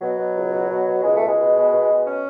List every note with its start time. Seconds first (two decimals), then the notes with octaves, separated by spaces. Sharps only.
0.01 B2 F#3
0.18 B2
0.35 C#2
0.52 B2
0.69 B2
0.87 B2
1.03 C#2 G#3
1.15 A3
1.21 B2
1.27 G#3
1.38 B2
1.56 B2
1.72 B2
1.89 B2
2.06 C#4